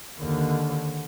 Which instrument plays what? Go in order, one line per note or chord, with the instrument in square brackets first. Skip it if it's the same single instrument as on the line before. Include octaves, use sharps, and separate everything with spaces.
[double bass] D#2 D3